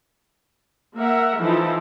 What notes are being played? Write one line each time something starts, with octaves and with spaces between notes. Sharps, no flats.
A#3 A#4 E5 F#5
E3 F3 D#4 E4 A4